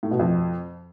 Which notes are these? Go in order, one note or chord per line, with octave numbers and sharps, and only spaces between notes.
A2
B2
F2